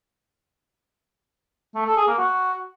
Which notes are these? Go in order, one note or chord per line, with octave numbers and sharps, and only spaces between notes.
A3
A4
G#4
A#3
F#4